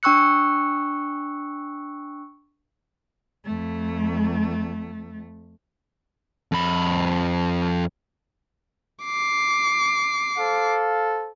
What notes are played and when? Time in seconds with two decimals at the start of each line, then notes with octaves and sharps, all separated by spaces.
0.03 D4 G5 C#6 E6 F#6 C#7
3.45 F2 A3
6.52 F2 B5
9.04 D6 C7
10.38 A4 C5 F5